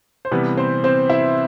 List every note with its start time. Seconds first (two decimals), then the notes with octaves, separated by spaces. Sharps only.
0.25 C5
0.31 C3 E3 G3 B3 B4
0.57 C4 C5
0.84 C4 C5
1.10 E4 E5